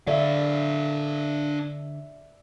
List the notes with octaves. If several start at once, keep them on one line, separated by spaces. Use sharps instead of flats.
D3 D4 D5 E5 F5